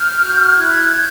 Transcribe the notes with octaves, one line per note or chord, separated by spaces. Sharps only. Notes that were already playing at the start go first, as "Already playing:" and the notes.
Already playing: F6 G6
F#4
E4 F#6 G#6
G6